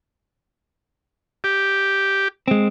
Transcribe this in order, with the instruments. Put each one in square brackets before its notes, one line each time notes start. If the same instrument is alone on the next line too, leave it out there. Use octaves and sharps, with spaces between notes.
[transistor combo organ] G4
[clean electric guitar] G#3 C4